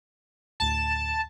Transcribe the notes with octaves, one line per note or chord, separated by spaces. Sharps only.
D2 A2 A5